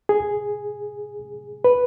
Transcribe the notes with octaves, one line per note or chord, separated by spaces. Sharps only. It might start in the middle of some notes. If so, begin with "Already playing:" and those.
G#4
B4